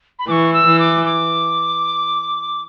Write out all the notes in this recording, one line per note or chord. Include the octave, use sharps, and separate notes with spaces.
B5
E3 C#6 D6
E6
E3
D6
D6